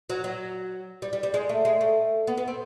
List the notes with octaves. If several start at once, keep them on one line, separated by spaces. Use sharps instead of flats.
F#3
F#3
G3
G3
G3
G#3
A3
G#3
A3
B3
B3
C4